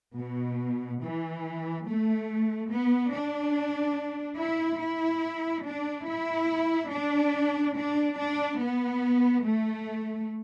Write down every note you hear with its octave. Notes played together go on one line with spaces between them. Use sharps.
B2
E3
A3
B3
D4
E4
E4
D4
E4
D4
D4
D4
B3
A3